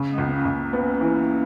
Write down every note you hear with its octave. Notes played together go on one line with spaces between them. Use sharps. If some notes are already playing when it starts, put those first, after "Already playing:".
Already playing: C#3
G#3 B3
C#2
B3
A#3 C#4
C#2
A#3 C#4
B3
E3